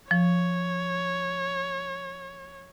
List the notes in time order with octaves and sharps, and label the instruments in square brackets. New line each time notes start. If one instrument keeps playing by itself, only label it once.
[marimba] F3 [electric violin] C#5